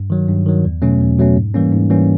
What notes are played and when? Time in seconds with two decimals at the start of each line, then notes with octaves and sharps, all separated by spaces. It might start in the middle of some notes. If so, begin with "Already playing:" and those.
Already playing: G2
0.10 D#3 F#3
0.28 G2
0.46 D#3 F#3
0.64 E2
0.82 B2 F#3 A3 C#4
1.01 E2
1.19 B2 F#3 A3 C#4
1.37 G#2
1.54 E3 G3 A#3 C#4
1.72 G#2
1.90 E3 G3 A#3 C#4